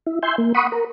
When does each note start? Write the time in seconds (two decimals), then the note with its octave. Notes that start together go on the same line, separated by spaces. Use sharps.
0.07 E4
0.23 E5 G#5 C6 G6
0.38 A#3
0.55 F#5 B5 C#6 D#6
0.72 A#4